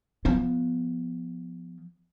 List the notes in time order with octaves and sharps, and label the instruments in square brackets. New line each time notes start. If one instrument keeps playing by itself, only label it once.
[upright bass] F3 B3